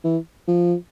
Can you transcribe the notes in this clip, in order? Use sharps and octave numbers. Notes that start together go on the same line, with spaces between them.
E3
F3